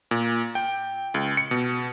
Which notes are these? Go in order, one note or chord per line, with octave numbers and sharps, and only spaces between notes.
A#2
G5
C#2
C#7
B2